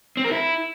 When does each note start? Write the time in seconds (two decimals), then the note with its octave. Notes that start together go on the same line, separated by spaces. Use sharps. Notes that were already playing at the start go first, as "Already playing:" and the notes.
0.17 C4
0.24 A#4
0.32 E4